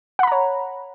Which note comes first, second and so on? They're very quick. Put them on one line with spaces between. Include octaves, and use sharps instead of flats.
F#5 B5 A#5 C#5